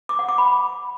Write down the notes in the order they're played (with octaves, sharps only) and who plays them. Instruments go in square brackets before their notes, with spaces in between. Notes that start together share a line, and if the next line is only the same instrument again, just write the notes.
[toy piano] D6
F#5
D6
B5